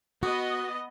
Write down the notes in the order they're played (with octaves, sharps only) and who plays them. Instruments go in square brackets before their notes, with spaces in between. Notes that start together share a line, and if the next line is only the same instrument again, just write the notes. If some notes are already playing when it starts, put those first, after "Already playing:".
[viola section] B3 D#5 [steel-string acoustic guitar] F#4 [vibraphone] D#6